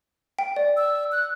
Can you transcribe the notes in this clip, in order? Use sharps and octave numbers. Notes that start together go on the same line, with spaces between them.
G5
D5
E6
F#6